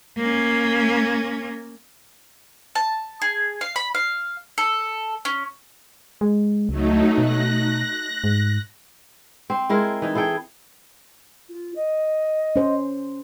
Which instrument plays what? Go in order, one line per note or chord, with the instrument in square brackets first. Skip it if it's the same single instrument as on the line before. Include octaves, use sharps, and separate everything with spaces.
[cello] A#3 C#4
[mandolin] A5
G#4
F5
B5
F5
A4
C#4
[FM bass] G#3
[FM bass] C#2 [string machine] F#3 A3 D#4
[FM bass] B2 [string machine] F#6 A#6
[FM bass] G#2
[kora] C4
G#3 E4 A#4
E3 D#4
E4 G#4 A4 G5
[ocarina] F4
D#5
[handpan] C#4 C5